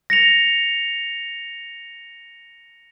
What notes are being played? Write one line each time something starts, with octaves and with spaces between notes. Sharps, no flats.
A#6 C#7 F7